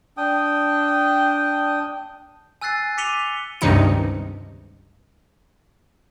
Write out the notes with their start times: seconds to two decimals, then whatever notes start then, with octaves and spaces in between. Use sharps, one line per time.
0.17 D4 G5 D#6
2.61 G#5 E6 F#6 A6 C7
2.98 D6 B6 C#7 D#7 F7 G7
3.61 C#2 G2 C3 D#3 D#4 C#7